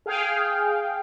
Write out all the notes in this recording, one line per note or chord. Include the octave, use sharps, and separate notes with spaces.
G#4 F5 G5